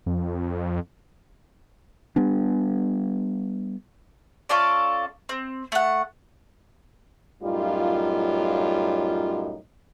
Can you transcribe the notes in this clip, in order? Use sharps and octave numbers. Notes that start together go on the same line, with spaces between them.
F2
G3 B3 D4
C#4 F4 A4 D5
C4
A3 F#5
F#2 A2 G3 D#4 F4